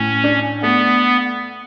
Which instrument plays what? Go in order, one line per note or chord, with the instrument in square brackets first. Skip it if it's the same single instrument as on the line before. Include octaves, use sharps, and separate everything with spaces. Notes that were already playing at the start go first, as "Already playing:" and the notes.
Already playing: [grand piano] A2 [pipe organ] C#4
[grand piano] D4
[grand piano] A3 [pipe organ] B3